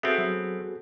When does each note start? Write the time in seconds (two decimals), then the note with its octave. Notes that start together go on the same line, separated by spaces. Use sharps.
0.03 B3 C4 F#4 G#4 A4 E5
0.18 F#3